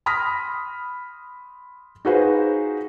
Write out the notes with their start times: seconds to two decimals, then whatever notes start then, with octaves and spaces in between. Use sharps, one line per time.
0.06 B5 C6 D#6 F6 A#6 B6
2.05 D#4 F4 F#4 G#4 B4 C5